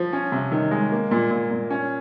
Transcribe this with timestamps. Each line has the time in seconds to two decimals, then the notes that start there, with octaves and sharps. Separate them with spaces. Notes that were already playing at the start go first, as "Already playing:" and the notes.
Already playing: F3
0.13 C#4
0.32 C3
0.51 D#3
0.71 G#3
0.92 A#3
1.11 A#2
1.31 A#2
1.51 A#2
1.70 C#4